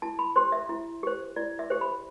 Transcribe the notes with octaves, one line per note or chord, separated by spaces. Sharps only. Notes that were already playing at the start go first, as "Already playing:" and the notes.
E4 A5
B5
G4 C5 C6
E5
E4
G4 C5
E4 D5
E5
G4 C5
B5